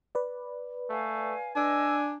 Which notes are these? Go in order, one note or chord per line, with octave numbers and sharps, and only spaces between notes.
B4 D5
A3 F5 G#5
D4 D#5 G#5 E6